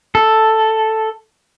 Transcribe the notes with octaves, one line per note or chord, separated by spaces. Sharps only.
A4